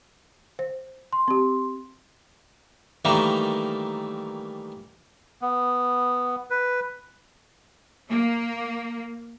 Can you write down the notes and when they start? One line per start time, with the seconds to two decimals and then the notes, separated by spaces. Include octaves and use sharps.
0.59 C5
1.13 C6
1.28 C4 G4
3.05 D#3 E3 G3 A3 A#3
5.42 B3
6.50 B4
8.09 A#3